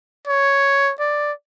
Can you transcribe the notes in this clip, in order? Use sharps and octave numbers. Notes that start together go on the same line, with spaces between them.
C#5
D5